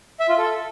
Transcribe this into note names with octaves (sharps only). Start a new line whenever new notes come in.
E5
F4
A4